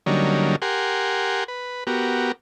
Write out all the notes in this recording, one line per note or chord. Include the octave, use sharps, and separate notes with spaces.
D3 F#3 G3 A#3 C#4 D#4
G4 A#4 F#5 G#5 C6
B4
B3 F#4 G4 A#4